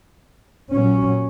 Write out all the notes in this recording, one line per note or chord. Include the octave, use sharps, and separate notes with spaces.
A#2 F#3 C#4